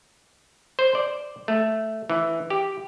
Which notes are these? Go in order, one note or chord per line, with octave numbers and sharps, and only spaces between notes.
C5
D5
A3
E3
G4